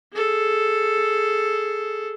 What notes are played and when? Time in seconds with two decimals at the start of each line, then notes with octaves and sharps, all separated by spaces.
0.13 G#4 A4